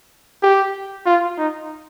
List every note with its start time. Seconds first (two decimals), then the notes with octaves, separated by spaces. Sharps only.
0.43 G4
1.06 F4
1.38 D#4